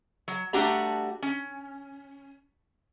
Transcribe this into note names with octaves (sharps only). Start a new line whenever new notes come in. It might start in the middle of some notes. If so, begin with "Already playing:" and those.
F#3
G3 A3 D4 F#4 G4 A#5
C#4